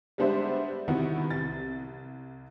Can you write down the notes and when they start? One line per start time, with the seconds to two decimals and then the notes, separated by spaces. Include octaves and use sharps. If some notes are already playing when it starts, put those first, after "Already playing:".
0.18 G3 G#3 B3 D4 C5 E5
0.88 C3 D#3 E3 B3 E4 F#4
1.31 C2 A6